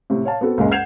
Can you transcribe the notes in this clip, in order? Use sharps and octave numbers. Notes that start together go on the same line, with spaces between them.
A2 C3
C#5 F5 A5
B3 C4 F#4 A4
C#2 F#2 A#2 G#3
F#5 G6 G#6 C7 E7 F7